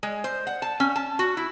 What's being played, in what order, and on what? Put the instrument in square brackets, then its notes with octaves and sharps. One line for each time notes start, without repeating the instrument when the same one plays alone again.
[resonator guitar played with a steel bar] G#3
C5
F#5
A5
C#4
A5
F#4
E4